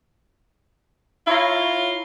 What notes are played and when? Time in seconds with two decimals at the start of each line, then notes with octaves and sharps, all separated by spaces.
1.27 E4 F4 C#5 A#5